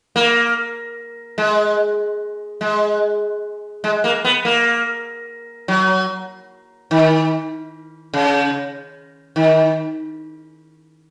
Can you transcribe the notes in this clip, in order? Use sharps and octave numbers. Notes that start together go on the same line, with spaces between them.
A#3
G#3
G#3
G#3
A#3
B3
A#3
F#3
D#3
C#3
D#3